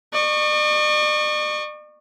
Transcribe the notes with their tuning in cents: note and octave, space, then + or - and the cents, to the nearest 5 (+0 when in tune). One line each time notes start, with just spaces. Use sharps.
D5 +45 C#6 +0